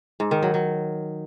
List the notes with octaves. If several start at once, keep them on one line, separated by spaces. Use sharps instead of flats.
G#2
D#3
F#3
F#3